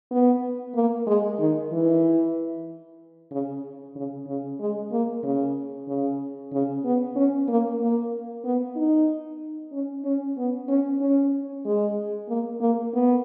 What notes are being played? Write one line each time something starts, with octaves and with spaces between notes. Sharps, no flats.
B3
A#3
G#3
D#3
E3
C#3
C#3
C#3
G#3
A#3
C#3
C#3
C#3
B3
C#4
A#3
A#3
B3
D#4
C#4
C#4
B3
C#4
C#4
G#3
A#3
A#3
B3